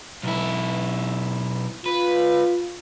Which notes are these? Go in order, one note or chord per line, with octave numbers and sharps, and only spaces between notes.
B1 E4
F4 B4